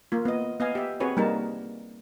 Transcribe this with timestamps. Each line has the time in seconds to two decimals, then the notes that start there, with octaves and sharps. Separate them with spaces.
0.12 A#3 F4
0.25 B3 D#5
0.60 B3 D#5 F5 G#5
0.75 G4 E5
1.00 C4 F#4 G#4 B4 C#5
1.17 G3 A#3 D#4 A#4 A5